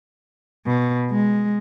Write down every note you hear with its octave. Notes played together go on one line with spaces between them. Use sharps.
B2
G#3